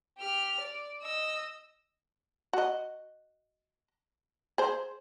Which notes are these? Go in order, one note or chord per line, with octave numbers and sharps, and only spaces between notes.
G4 F6
D5
D#5 E6
F#4 D#5
G#4 C5